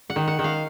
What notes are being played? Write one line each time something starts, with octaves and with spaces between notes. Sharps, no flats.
F#5
D#3
F#5
D#3
F5